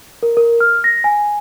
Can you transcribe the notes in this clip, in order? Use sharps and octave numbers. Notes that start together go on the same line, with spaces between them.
A#4
A#4
F6
A#6
G#5